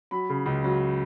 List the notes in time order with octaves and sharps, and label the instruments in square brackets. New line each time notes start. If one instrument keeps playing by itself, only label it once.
[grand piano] F#3 B5
C#3
C#2
F#3